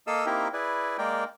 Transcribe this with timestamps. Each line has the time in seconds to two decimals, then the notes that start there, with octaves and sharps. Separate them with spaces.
0.07 A#3 A4 D#5 F5 E6
0.26 A#3 C4 D#4 E4 G4 A#4
0.53 E4 G#4 B4 D5
0.98 G#3 A#3 A#4 D5 G5